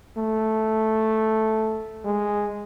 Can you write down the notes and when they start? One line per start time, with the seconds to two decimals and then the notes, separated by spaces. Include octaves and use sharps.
0.17 A3
2.05 G#3